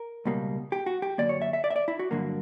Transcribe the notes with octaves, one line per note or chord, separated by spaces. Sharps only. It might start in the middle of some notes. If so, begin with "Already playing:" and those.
Already playing: A#4
C#2 B2 G3 A#3
G4
F#4
G4
F#2 D3 A#3 D5
C#5
E5
E5
D5
E5
D5
E4
F#4
G2 D3 F#3 A#3